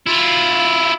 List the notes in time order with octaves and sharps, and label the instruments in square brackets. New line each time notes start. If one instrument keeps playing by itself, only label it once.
[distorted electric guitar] E4 F4